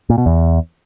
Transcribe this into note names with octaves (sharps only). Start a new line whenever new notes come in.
A#2
B2
E2